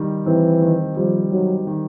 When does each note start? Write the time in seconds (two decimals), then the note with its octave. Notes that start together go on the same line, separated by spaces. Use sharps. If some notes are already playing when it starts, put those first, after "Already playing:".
Already playing: D#3 G3
0.26 E3 C4
0.62 D#3
0.97 F3 G3
1.31 D#3 F#3
1.67 D#3